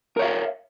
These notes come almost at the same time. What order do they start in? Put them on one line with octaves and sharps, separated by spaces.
A#4 C#5 E5 F5